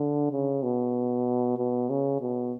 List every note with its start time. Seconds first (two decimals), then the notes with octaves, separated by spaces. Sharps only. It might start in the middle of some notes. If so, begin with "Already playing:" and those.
Already playing: D3
0.32 C#3
0.63 B2
1.58 B2
1.90 C#3
2.22 B2